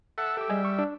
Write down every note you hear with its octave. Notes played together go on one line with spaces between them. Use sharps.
A4 E5 F#5
G4 A4 E5 D6
G3 G#4 D#5 G#5
C#6
D4